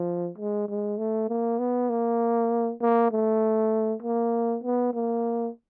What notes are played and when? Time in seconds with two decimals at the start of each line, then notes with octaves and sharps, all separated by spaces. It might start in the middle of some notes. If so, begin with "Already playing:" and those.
Already playing: F3
0.38 G#3
0.69 G#3
0.98 A3
1.29 A#3
1.59 B3
1.90 A#3
2.81 A#3
3.12 A3
4.02 A#3
4.64 B3
4.94 A#3